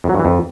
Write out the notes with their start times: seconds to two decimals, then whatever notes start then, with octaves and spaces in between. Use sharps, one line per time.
0.04 F2
0.09 F#3
0.14 G2
0.20 E3
0.25 F2